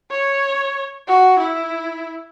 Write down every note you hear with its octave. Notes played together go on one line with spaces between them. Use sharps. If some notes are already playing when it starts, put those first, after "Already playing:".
C#5
F#4
E4